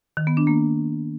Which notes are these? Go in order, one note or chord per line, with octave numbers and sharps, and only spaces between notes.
D#3
B3
D4
A#3